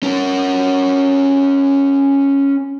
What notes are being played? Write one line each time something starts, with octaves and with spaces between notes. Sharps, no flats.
C#4 A#4